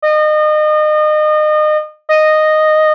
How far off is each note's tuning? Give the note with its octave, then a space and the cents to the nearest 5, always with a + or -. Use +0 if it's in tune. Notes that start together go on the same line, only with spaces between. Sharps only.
D#5 -30
D#5 -10